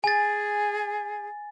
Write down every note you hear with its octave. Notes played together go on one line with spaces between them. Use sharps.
G#4 G#5 A6